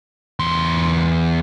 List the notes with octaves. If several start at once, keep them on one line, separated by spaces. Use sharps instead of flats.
E2 C6